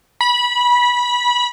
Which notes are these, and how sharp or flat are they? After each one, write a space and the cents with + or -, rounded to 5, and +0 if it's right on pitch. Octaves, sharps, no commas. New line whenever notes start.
B5 -20